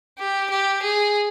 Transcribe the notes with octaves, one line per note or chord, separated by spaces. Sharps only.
G4
G4
G#4